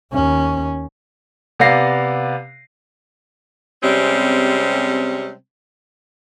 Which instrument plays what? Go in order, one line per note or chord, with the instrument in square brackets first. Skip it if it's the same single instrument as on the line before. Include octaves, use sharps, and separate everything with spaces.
[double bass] D#2 C#4
[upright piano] C3 B3 D5 F5 A#6 C7
[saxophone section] C3 G3 G#3 C4 C#4